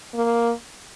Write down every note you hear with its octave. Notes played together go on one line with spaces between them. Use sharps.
A#3